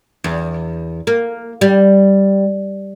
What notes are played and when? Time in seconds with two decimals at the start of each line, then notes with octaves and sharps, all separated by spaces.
0.24 E2
1.07 A#3
1.61 G3